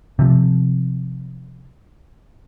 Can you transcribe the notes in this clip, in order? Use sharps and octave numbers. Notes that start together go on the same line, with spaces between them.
C3 F3